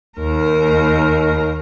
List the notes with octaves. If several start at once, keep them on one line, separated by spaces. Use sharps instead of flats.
D#2 A#4